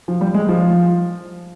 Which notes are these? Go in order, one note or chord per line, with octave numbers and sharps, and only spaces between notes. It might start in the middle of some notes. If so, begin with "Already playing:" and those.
F3
G3
G#3
F3